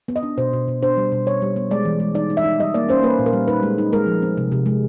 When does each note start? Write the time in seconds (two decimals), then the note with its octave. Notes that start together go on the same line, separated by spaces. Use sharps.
0.08 B3
0.16 D#5
0.23 D4
0.38 B2 C5
0.53 B2
0.68 B2
0.82 D4 C5
0.97 G3
1.12 B2
1.26 G3 C#5
1.42 G3
1.56 B3
1.71 G#3 D5
1.85 E3
2.00 G#3
2.15 D#4 D5
2.30 D#4
2.37 E5
2.44 D#4
2.59 G3 D#5
2.74 A#3 D5
2.89 C#4 C5
3.03 A#3 B4
3.19 A#2
3.26 A#4
3.33 G3
3.48 D#4 B4
3.63 G#3
3.78 D#4
3.92 G#3 A#4
4.07 F3
4.22 C4
4.37 C3
4.52 C3
4.66 G#3